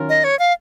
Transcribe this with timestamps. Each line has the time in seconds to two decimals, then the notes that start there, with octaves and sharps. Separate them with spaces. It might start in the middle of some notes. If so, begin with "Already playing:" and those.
Already playing: D#3 F#3 C#4 F4 A#4
0.09 D#5
0.24 C#5
0.39 F5